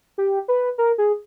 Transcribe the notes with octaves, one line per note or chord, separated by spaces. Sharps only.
G4
B4
A#4
G#4